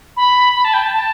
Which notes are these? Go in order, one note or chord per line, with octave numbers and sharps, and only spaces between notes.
B5
B5
A5
G5
A5
A5